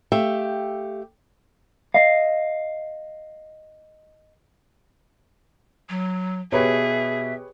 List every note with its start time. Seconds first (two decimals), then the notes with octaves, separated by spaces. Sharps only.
0.12 A3 G4 E5 F5 G5
1.94 D#5 F5
5.89 F#3
6.52 B2 G4 G#4 B4 C#5 E5